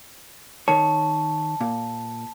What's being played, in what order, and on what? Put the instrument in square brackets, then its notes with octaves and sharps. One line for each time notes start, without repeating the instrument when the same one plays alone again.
[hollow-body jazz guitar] D#3 C#5 [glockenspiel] A5
[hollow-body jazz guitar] A#2